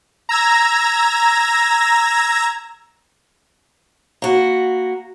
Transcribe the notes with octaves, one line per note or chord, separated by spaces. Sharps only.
A#5 E6 G#6 A#6
A#3 F#4 B4